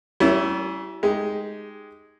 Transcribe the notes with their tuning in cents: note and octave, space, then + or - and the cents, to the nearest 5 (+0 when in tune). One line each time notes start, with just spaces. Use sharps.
G3 -40 C#4 +0 E4 +5
G#3 +0 D#4 +0 G4 +0